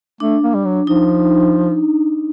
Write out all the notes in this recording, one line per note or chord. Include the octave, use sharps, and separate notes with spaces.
A3 D4
A#3
G3
F#3
F3 D#4